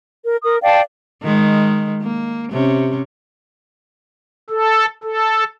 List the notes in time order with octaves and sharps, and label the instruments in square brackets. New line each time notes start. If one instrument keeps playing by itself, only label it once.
[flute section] A#4
A#4 D#6
D5 F5 G5 A5
[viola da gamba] D#3 G#3
A#3
C3 C#4
[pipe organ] A4
A4